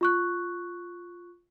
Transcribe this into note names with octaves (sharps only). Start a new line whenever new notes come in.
F4 C#6 F#6